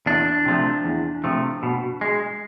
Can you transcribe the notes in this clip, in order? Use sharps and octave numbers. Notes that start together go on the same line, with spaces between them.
E2 D4
C3 F3 A3
E2
C3 F3 A3
B2
G#3